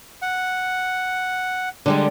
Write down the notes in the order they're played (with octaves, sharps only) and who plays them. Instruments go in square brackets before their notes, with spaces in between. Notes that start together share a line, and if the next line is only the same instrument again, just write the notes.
[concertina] F#5
[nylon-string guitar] D3 G3 G#3